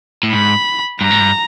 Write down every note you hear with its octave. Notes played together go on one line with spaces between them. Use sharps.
A2
G#2 B5
G2 A#5
G#2
G2